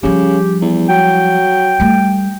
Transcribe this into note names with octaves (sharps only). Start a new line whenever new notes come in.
C#3 F3 G3 G4
E2
F#3 G5
G3 A3